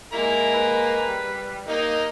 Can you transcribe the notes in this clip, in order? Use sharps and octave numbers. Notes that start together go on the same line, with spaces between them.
G#3 A#3 E4 A#5
B4
G3
A#3 D#4 D#5